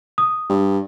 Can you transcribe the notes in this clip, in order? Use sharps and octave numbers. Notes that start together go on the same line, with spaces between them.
D#6
G2